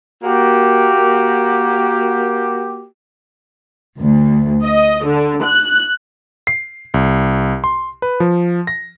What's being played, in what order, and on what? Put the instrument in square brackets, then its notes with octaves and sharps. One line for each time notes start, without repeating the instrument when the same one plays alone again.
[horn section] A#3 F#4 G4
[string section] D2
D#5
D3
F#6
[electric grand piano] C7
C2
C6
B4
F3
A#6